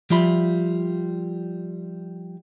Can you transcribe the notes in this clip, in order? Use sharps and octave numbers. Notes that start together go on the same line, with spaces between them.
F3 G3 F4 E5 B5